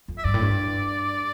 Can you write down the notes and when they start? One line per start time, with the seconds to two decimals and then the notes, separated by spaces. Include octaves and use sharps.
0.08 F2
0.18 E5
0.24 G2 D5
0.34 A2
0.41 G2